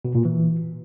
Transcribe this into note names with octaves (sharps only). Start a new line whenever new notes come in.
B2
A#2
E3